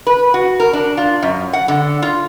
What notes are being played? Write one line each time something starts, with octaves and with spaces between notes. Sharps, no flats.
B4
F#4
A#4
D4
F4
F#2
F#5
D3
F4